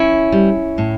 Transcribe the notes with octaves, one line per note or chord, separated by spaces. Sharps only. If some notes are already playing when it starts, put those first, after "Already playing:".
Already playing: C#4 E4
G3
A2